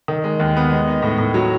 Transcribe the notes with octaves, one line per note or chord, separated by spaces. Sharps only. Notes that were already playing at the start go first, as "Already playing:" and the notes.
D#3
G#3
D#2
B3
G#3
D#4
A2
A2
F#3